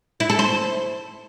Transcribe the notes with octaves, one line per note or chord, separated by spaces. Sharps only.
E4
A4
C5